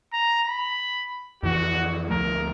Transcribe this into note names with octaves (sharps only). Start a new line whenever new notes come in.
A#5
B5
F2 E3 F#4
D2 F3 A3 A#4